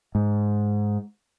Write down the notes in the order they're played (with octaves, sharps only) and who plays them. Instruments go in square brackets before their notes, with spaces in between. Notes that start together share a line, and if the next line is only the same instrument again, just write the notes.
[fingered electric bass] G#2